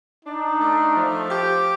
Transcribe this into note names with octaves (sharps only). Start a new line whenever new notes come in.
D4 D#4
A3
F3
G4